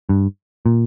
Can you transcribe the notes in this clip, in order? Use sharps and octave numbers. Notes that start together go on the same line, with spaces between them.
G2
A#2